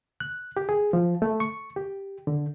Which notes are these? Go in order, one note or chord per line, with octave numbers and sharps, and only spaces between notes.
F#6
G4
G#4
F3
A3
C#6
G4
D3